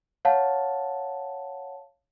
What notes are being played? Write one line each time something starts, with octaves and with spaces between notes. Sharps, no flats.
C#5 F5 F#5 A5